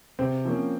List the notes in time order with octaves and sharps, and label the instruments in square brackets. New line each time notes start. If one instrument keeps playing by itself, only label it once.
[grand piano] C3 [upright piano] C4
[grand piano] F3 A#3 C#4